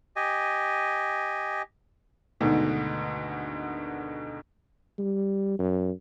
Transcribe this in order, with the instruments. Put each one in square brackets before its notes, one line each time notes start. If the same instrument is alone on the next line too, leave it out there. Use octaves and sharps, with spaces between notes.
[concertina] G4 D#5 G#5
[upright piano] D2 G#2 B2 D3 D#3
[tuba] G3
F#2